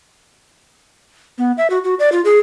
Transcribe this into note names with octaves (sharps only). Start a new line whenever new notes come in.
B3
E5
F#4
F#4
D5
F4
G#4